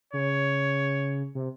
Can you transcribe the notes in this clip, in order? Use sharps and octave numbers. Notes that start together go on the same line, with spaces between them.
C#3 C#5
C3